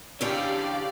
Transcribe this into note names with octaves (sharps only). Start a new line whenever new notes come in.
E2 D3 C#4 G4 A4 C#5 D5 F5